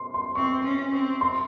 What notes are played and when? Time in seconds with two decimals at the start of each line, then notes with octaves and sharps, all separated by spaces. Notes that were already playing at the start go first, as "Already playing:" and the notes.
Already playing: C6
0.14 C6
0.35 C4 C#6
0.64 C#4
0.92 C4
1.21 C6